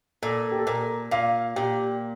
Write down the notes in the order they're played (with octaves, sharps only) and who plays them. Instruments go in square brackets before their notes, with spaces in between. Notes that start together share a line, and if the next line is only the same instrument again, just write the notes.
[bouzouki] A#2 [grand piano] A4
[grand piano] G4
A4
[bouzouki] A#2 [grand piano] A#4
[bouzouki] A#2 [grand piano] F5
[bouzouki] A#2 [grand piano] G4